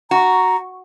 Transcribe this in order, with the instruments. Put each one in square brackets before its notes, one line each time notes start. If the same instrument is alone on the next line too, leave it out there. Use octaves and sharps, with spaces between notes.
[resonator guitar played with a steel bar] F#4 [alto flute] A#5